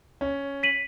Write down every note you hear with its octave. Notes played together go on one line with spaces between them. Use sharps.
C#4
B6 D#7 F#7